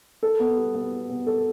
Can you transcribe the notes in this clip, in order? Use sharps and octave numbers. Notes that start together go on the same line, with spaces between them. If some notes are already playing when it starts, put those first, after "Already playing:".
A4
B3
G3
B3
B3
B3
A4